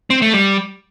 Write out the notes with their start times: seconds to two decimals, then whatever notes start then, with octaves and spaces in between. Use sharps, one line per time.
0.10 C4
0.22 A3
0.33 G3